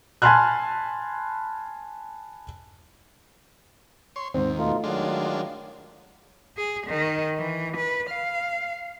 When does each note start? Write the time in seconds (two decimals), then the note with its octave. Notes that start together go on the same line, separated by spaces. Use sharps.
0.22 G#5 A5 B5 C6 F6 F#6
4.16 C#5 C6
4.34 D#2 G#2 C4
4.58 B2 A3 D#4 F4
4.84 D#3 F#3 G#3 D4 F4
6.57 G#4
6.87 D#3
7.38 E3
7.77 B4
8.10 F5